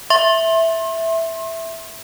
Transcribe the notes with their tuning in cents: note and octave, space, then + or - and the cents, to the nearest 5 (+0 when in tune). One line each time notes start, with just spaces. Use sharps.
E5 +0 C6 +35